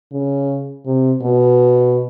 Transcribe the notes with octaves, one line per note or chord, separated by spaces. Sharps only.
C#3
C3
B2